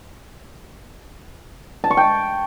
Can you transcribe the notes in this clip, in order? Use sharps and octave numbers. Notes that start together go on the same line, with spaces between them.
A5
C#6
G5